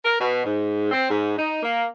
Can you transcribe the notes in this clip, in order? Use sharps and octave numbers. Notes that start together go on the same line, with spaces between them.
A#4
B2
G#2
C4
G#2
D#4
A#3